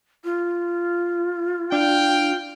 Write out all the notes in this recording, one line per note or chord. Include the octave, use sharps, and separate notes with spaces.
F4
D4 F5 G5